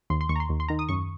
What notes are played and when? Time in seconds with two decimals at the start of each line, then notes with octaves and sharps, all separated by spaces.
0.10 D#2 C6
0.21 C6
0.29 D#2 C#6
0.36 A#5
0.40 C6
0.49 D#2
0.60 C6
0.68 D#3 A#5
0.79 D#6
0.89 F#2 C#6